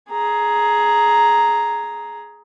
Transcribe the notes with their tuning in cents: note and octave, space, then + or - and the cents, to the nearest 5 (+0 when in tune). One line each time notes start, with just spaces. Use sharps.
G#4 +15 A#5 +0